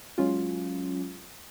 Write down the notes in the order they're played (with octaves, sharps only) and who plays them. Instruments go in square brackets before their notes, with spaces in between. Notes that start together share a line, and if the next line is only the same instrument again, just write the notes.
[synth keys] F#3 G#3 C#4 F4